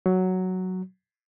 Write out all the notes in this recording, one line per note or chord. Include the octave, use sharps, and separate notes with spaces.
F#3